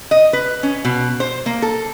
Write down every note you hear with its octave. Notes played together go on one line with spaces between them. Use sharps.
D#5
B4
C#4
B2
C5
A#3
A4